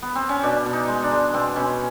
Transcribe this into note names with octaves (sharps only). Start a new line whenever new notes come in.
B3
C4
C#4
B2 D4
B2
D#4
G#3
D4
G#3
B2 C4
B2 C#4